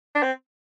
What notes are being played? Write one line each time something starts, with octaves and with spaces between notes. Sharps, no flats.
D4
C4